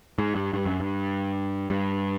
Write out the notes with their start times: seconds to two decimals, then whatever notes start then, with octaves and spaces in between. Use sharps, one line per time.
0.18 G#2
0.35 G2
0.53 G2
0.66 F#2
0.80 G2
1.70 G2